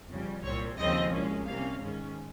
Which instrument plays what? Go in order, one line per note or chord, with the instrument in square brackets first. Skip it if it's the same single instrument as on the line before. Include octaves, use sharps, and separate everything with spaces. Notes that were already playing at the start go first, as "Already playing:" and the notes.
[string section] F2 C#3 G3
C2 A#2 G3 C4 C#5
D#2 C#3 F3 G#3 C4 D#5
C2 A#2 G#3 C#4
C3 G3 A#3 C#4 F5
G#2 D#3 G#3 C#4